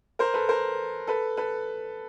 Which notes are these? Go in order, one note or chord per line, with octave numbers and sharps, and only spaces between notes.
A#4 C5
A4 B4
A#4 C5
A4 B4
A4 B4